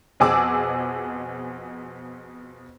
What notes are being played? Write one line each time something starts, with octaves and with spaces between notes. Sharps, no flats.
F2 B2 G#4 A5 D6 E6